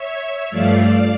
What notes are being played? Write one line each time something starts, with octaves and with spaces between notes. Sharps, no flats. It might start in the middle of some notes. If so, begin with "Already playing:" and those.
Already playing: C#5 E5
G2 F3 A3 D5 F5